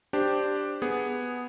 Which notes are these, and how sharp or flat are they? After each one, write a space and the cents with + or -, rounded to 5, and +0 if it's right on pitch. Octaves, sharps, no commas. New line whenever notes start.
D4 +5 G4 +0 C5 +0
B3 +0 G#4 +0